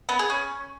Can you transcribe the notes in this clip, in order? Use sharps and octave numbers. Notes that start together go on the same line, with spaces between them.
B3
G#4
C#4